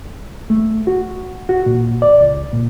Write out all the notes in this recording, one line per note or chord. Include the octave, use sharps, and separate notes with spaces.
A3
F#4
F#4
A#2
D5
C#2
A#2